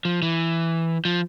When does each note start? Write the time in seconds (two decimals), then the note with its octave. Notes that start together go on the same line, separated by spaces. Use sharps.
0.05 F3
0.22 E3
1.05 F3